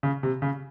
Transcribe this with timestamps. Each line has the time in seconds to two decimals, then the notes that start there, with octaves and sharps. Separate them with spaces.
0.03 C#3
0.23 C3
0.42 C#3